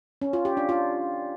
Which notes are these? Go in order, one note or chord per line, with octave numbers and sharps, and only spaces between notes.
C#4
F4
G4
D4
F4